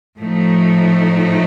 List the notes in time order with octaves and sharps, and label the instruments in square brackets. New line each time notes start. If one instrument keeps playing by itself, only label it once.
[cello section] A2 F3 A3 D#4